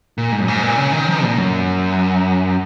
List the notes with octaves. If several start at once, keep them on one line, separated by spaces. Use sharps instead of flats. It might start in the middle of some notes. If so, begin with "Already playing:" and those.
A#2
G#2
F#2
G#2
A#2
C#3
D#3
F3
A#2
F#2